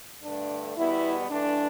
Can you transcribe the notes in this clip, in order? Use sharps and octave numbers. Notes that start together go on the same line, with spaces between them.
G2 D3 A3 D4
E2 B2 G3 B3 E4
G2 E3 A3 D4